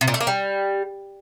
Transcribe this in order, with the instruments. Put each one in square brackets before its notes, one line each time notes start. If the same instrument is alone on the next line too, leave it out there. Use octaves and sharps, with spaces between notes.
[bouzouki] C3
A#2
A3
A#3
G3